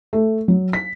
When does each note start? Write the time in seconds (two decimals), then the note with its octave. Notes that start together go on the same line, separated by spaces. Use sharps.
0.13 A3
0.48 F#3
0.73 B6